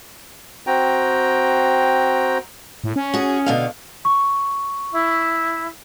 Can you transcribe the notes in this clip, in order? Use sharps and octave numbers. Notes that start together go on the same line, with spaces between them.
C4 F#4 G5 A#5
A2
C#4
F#4 G#4
B2 D3 F5
C#6
E4